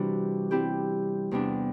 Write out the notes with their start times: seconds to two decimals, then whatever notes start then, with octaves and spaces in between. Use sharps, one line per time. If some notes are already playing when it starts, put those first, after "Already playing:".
Already playing: C3 E3 G3 D4 F#4
0.51 G3 C4 E4 G4
1.31 E2 C3 E3 B3 D4